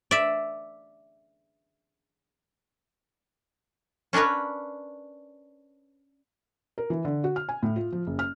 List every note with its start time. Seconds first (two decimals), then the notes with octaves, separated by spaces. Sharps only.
0.11 D5 E5
4.13 C#4 D4 A#4 B4 C#5
6.78 A#4
6.90 E3
7.05 D3
7.24 F#4
7.36 F6
7.49 G#5
7.63 A2
7.76 F4
7.92 F3
8.07 F#1
8.19 F6